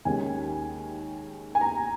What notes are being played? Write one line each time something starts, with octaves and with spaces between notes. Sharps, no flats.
D#2 D#3 G#3 C#4 G#5
G#5
A#5